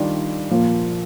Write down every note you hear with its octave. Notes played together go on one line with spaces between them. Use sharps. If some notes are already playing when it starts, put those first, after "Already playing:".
Already playing: D#3 G3 D4 F4
A#2 F3 A#3